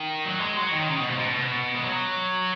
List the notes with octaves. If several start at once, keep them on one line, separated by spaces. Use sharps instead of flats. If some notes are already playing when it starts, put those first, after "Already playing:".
Already playing: D#3
F#3
G#3
F#3
D#3
C#3
B2
G#2
B2
B2
G#3
F#3